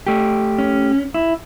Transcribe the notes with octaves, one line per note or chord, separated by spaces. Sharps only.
A3 G4
C#4
E4